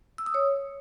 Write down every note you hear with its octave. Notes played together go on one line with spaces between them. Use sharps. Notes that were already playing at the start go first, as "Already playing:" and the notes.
E6
D#6
C#5